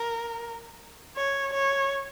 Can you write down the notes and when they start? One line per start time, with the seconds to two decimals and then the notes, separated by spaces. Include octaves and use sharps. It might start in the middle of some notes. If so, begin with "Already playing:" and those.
Already playing: A#4
1.17 C#5
1.53 C#5